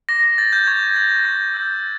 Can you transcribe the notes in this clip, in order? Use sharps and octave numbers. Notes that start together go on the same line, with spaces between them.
D6 A#6
A#6
G6 A6
G6
C#6 G#6
F#6 A6
C#6 A#6
E6 G6